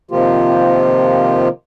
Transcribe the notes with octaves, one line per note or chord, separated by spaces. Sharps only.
C3 D#3 F3 A#3 F4 G4